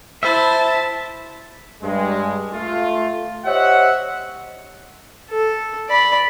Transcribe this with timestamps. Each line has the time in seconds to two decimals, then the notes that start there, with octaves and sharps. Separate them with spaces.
0.23 E4 C5 E5 A5 B5
1.83 G2 G#3
2.54 A3 F4
3.45 G4 C5 C#5 D#5 E5 F#5
5.30 A4
5.89 D5 B5